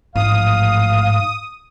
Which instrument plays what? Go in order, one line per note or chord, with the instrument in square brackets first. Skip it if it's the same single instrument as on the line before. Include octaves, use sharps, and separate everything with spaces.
[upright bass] A1 F3 [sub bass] G#2 [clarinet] F5 [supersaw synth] D#6